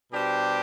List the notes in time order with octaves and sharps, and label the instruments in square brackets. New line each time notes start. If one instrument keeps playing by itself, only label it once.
[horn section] B2 G3 D4 G4 C5